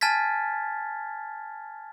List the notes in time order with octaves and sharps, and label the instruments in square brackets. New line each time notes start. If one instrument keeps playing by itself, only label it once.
[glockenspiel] G#5 A5 F6 G#6 A6 B6